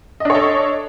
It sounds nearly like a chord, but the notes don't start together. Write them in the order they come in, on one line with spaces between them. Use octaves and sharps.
D#5 D4 C#5 A4